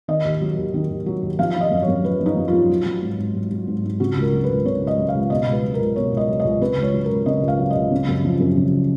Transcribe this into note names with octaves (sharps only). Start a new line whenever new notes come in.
D#3 D#5
D#2
F#3
D#2
D#3
D#2
F#3
D#2
F3 F5
F3
D#5
F#2
C#5
F#2
F3 B4
F3
D#4
F#2
F4
F#2
F#3
F#3
G#2
G#2
F#3
F#3
G#2
G#2
C#3 F#4
C#2
A#4
F#3
B4
C#2
C#3 C#5
C#2
D#5
F#3
F5
C#2
B2 D#5
C#2
B4
F#3
A#4
C#2
B2 C#5
C#2 D#5
F#3
C#2 D#5
C#3 B4
C#2
C#5
F#3
A#4
C#2
C#3 D#5
C#2
F5
F#3
D#5
C#2
C#3
F#2
F3
F#2
C#3